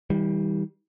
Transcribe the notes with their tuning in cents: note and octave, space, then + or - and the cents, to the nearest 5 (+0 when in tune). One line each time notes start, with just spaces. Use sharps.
E3 -45 G3 +5